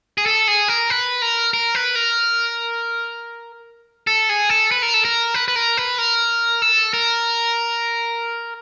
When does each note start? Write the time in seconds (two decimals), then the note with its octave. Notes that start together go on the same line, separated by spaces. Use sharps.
0.18 G#4
0.26 A4
0.48 G#4
0.68 A#4
0.90 B4
1.22 A#4
1.54 A#4
1.75 B4
1.95 A#4
4.07 A4
4.29 G#4
4.50 A4
4.71 B4
4.82 A#4
4.94 A4
5.05 A#4
5.34 B4
5.48 B4
5.56 A#4
5.77 B4
5.98 A#4
6.62 A4
6.94 A#4